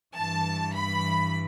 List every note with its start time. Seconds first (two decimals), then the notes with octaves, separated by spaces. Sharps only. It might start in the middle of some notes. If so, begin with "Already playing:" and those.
0.16 G2 E3 A5
0.74 B5